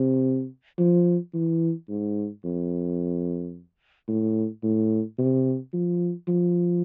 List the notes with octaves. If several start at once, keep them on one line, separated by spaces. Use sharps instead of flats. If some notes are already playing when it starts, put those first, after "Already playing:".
Already playing: C3
F3
E3
G#2
F2
A2
A2
C3
F3
F3